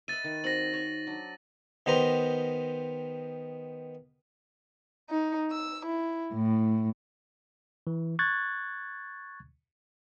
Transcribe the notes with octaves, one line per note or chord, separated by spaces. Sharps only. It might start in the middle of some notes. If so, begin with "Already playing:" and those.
B4 D#5 E5 A6 D#7
D#3
C4 D#4 F#4 A#6 F#7
C#5
F#3 D4
D#3 B3 G4 C5 A#5
D#4
E6
E4
A2
E3
C#6 F#6 G#6 A6